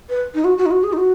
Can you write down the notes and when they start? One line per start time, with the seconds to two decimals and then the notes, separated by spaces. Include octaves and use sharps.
0.10 B4
0.35 D#4
0.44 F#4
0.58 F#4
0.66 D#4
0.71 F#4
0.83 G#4
0.93 D#4
0.97 F#4